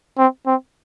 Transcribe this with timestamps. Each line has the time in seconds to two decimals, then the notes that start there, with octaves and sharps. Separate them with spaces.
0.18 C4
0.46 C4